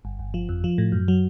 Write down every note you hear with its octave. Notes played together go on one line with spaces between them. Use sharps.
G1
G1
F3
F2
F3
A2
F#2
F#3